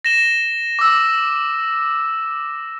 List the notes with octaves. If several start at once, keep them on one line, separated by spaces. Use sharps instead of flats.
A#6 E7 G7
D6 E6